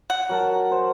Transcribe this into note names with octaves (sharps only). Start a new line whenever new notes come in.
F#5
F#3 A#4 A5
C5